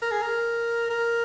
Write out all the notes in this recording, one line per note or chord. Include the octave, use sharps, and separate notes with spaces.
A#4
G#4
A#4
A#4